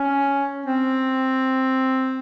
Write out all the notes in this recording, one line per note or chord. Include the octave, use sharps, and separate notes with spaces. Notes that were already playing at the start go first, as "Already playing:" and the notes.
Already playing: C#4
C4